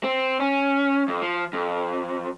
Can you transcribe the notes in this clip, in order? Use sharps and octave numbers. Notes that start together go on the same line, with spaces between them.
C4
C#4
F2
F3
F2